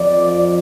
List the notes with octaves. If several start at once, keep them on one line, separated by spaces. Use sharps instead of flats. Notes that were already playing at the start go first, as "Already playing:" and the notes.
Already playing: F2 F3 D5